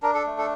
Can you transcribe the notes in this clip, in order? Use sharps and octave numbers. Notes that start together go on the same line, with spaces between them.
D4 A#4
A4
A3
A4